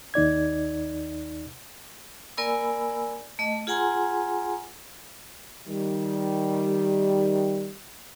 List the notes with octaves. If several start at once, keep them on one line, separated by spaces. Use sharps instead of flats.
D#2 D#4 D5 G#6
A#3 A#4 D5 G#5 B5 E6
A3 D#5
F4 G#4 F#5 G#5 A#5 C6
D#3 G3